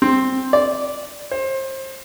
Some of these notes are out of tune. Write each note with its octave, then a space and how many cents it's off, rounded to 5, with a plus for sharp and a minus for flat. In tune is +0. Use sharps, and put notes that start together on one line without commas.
C4 +5
D5 -10
C5 +30